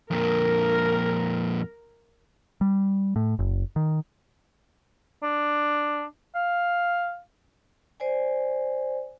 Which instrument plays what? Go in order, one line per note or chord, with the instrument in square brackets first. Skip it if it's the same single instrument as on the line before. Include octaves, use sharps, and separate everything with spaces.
[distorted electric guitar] F2 A#2 [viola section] A#4
[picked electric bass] G3
A2
F#1
D#3
[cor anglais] D4
F5
[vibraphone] C5 D5 G#5